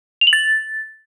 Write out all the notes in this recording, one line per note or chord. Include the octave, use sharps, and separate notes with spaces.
F7
F#7
A6